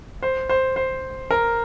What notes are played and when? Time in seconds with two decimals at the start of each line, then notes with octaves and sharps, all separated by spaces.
0.23 C5
0.49 C5
0.76 C5
1.31 A#4